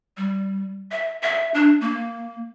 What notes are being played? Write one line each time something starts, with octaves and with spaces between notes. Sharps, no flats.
G3
E5
E5
D4
A#3